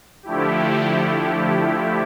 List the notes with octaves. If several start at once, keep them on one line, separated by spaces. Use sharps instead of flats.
D3 F3 A3 E4 G4